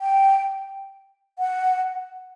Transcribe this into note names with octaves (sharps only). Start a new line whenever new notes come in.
G5
F#5